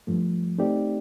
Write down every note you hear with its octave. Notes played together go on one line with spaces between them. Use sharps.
G2 F3 A3
A3 C4 D#4 G4 D5